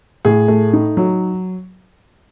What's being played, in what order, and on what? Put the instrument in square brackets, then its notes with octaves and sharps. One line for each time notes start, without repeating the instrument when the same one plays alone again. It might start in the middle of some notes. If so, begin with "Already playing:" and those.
[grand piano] A2 [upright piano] G#4
[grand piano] A3
D#4
F#3